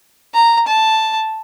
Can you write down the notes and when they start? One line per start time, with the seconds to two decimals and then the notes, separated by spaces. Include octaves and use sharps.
0.34 A#5
0.67 A5